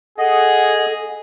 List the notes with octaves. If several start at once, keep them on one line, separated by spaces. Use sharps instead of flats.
G#4 A4 D#5 F#5